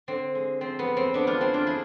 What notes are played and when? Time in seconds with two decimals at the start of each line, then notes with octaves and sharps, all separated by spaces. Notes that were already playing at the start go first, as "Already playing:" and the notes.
0.08 D3 C4
0.35 G#3
0.61 F3 C4
0.79 B3
0.87 F2
0.97 C4
1.14 D3 B3 D4
1.27 D4 F4
1.41 G#3 C4 E4
1.54 D4 F4
1.67 F3 E4 G#4